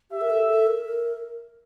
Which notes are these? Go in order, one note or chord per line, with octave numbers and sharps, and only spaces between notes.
G4 E5
A#4
A4
A4
A#4
A#4